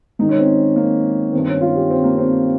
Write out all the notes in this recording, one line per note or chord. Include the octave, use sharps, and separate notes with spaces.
G#2 D#3 D#4
C#4
C4
A#3
G2 D#3 C4
C#4
F4
G4
C4
A#3
C4